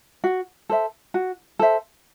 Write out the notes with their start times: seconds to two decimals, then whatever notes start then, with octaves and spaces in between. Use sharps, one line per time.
0.24 F#4
0.69 A4 C5 E5
1.14 F#4
1.59 A4 C5 E5